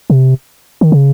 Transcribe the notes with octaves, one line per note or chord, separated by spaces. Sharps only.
C3
D#3
C#3